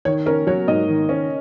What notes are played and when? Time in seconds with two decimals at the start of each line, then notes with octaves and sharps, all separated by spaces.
0.05 D#3 C#5
0.26 C#4 A#4
0.47 F#3 C#5
0.68 G#2 D#5
0.89 D#3
1.09 C#4